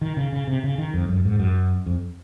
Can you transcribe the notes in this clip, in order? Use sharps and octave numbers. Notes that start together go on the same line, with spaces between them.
D#3
C#3
C#3
C3
C#3
D#3
F2
F#2
G#2
F#2
F2